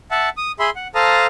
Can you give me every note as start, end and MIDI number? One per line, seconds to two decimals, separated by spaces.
0.11 0.29 76
0.11 0.29 78
0.11 0.29 81
0.37 0.52 87
0.60 0.70 68
0.60 0.70 76
0.60 0.70 83
0.60 0.70 84
0.76 0.88 78
0.95 1.27 69
0.95 1.27 72
0.95 1.27 77
0.95 1.27 81
0.95 1.27 82
0.95 1.27 87